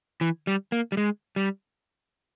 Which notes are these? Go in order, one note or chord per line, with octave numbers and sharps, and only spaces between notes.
E3
G3
A#3
G3
G#3
G3